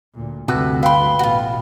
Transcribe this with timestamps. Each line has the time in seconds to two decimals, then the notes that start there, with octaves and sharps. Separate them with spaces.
0.15 D2 A#2
0.48 D2 G2 C3 F#4 A4 B4
0.83 B4 F5 G5 B5 C6
1.19 A1 B2 F4 F#4